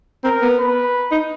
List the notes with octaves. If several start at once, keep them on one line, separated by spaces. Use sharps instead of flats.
C4 A#4
B3
B4
D#4